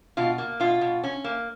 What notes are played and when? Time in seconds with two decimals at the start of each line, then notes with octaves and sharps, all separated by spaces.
0.17 B2 F4
0.38 A#3
0.60 B2 F4
0.81 B2
1.04 C#4
1.24 A#3